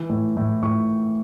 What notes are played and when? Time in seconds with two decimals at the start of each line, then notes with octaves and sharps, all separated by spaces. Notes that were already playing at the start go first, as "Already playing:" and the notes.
Already playing: E3
0.10 A2
0.37 A2
0.63 A2 C#6